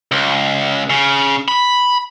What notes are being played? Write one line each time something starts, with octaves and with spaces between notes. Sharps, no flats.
C#2
C#3
B5